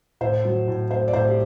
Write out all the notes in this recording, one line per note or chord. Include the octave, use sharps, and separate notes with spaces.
A2 C5
F#3
A2
A3 C5
D5
A2 C5
G4